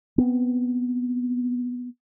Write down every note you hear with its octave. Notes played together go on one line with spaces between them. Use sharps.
B3 C4